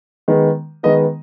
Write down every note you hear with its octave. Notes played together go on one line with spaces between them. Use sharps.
D#3 G#3 B3
D#3 G#3 B3 D#5